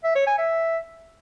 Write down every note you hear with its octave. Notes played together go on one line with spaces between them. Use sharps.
E5
C#5
G#5
E5